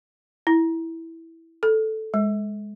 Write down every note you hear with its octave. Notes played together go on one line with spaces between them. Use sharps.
E4
A4
G#3